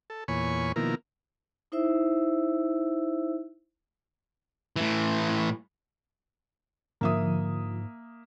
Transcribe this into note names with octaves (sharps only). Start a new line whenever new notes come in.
A4
E2 A#2 C#5 G#5 B5 C#6
B2 D#3 F3 A#3 E4 A#4
D#4 E4 C5 E5 E6
A2 E3
G#2 D3 F3 A#3 E5 D#6